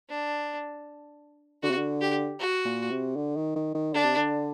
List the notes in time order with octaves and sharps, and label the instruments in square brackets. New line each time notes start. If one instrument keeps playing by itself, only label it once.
[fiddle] D4
[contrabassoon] D3 [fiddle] F#4
[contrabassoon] C3
D3
[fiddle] G4
F#4
[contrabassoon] A#2
C3
D3
D#3
D#3
D#3
[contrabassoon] D3 [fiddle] D4
[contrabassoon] C3
D3